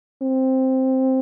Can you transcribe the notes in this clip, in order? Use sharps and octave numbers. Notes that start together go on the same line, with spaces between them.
C4